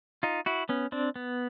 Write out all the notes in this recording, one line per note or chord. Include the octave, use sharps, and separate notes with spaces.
D#4 F4
E4 F#4
B3 C#4
C4 D4
B3